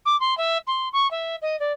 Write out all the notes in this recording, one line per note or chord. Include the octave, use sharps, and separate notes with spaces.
D6
C6
E5
C6
C#6
E5
D#5
D5